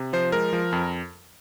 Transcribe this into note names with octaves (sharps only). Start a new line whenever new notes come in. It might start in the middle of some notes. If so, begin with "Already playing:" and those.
Already playing: C3
F3 C5
G#3 A#4
F3
F2